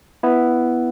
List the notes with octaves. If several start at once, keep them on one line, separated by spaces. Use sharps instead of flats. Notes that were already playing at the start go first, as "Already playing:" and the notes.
B3 E4